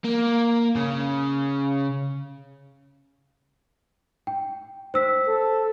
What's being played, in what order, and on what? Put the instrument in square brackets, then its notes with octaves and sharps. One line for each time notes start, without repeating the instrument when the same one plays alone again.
[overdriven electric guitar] A#3
C#3
[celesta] G5
C5 E6 B6
[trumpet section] A4